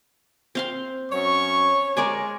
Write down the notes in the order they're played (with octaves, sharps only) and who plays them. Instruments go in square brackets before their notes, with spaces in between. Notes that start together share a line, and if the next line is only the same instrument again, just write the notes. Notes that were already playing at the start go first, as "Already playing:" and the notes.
[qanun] C4 F5 C6
[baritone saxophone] F#2 [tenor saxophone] C#5 [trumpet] C#6
[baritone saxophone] G#3 [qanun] A#4 D5 G#5